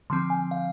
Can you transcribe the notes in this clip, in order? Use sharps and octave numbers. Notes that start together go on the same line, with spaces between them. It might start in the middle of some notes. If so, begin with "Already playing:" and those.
D3 F3 C4 C6
G#5
F5